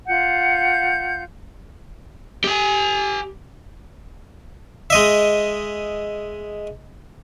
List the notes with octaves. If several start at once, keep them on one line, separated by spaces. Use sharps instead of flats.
F4 F#5 G6
G4 G#5
G#3 D#5 E5